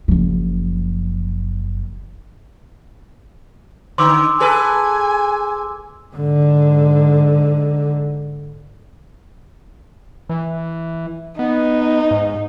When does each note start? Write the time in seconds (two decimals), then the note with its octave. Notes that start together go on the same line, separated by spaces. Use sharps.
0.08 F#1 F3
3.98 D3 C6 D6 E6
4.40 G#4 A4 B4 G#5
6.15 G#2 D3
10.29 E3
11.39 B3 D#4
12.11 G#2